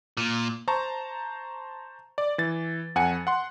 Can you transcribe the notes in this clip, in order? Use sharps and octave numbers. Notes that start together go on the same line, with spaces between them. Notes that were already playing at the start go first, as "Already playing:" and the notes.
A#2
C5 A5 A#5 C#6
D5
E3 A6
F2 F#5 G#5 C#7
F#5 C6